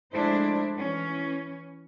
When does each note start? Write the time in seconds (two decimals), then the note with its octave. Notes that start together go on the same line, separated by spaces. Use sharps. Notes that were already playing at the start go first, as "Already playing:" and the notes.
0.15 F3 G#3 A3 D4 E4 C5
0.79 E3 C#4